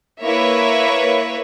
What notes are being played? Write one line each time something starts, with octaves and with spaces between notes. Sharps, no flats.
A#3 E4 B4 C#5 E5